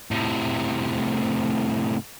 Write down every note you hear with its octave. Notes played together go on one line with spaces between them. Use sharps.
A2 C3